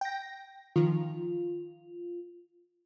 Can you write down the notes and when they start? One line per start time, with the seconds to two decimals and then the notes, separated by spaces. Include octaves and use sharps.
0.01 G5 A#6
0.76 D#3 F3 F4